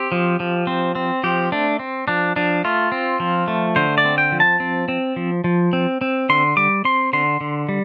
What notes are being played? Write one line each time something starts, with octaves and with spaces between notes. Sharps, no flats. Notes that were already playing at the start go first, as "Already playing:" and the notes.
Already playing: C4 G4
F3
F3
C4
C4
F3 G4
A3 D4
C4
F3 D4
F3 D4
A3 F4
C4
F3
A3
D3 C5
D5
C4
G5
F3
A5
C4
C4
F3
F3
C4
C4
D3 C6
G3 D6
C4 C6
D3 C6
D3
G3